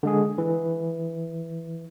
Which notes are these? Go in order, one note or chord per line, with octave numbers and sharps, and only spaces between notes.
D3 G#3 G#4
E3